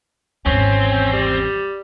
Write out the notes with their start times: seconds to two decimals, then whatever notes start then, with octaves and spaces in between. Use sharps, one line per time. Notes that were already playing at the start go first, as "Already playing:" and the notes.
0.46 G#1 E2 C4 C#4
1.13 G3